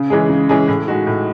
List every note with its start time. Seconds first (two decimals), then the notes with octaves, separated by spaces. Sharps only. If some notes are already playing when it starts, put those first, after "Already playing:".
Already playing: C#3
0.10 E3 G#3 C#4 G#4
0.29 C#3
0.49 E3 G#3 C#4 G#4
0.68 A2
0.88 G#3 D#4 F#4
1.07 A2